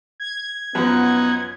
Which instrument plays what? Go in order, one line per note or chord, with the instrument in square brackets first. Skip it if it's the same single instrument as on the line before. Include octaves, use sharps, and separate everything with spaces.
[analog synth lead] G#6
[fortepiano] F#2 F3 B4 [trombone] B3 [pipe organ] D#4 F#5